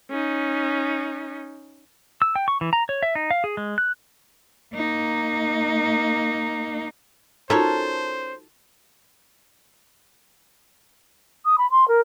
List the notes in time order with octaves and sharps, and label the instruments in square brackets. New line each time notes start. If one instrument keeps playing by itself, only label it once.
[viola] C#4 D#4
[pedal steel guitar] E6
G5
C#6
E3
A#5
C#5
E5
D#4
F5
G#4
G#3
F#6
[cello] A#3 D#4
[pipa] C#4 A#4 C#5 [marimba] D#4 F4 F#4 [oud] A4 [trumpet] C5
[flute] D#6
B5
C6
A#4